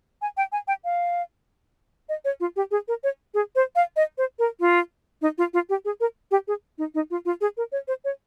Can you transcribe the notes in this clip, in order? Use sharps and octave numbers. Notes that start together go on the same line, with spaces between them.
G#5
G5
G#5
G5
F5
D#5
C#5
F4
G4
G#4
A#4
C#5
G#4
C5
F5
D#5
C5
A#4
F4
D#4
F4
F4
G4
G#4
A#4
G4
G#4
D#4
D#4
F4
F4
G#4
A#4
C#5
C5
C#5